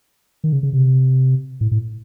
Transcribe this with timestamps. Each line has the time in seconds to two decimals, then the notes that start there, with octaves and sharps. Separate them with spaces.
0.44 D#3
0.53 C#3
0.63 C#3
0.73 C3
1.61 A2
1.71 A2